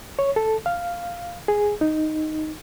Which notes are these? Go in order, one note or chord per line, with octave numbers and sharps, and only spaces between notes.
C#5
A4
F5
G#4
D#4